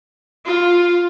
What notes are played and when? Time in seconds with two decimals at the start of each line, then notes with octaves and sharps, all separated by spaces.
0.45 F4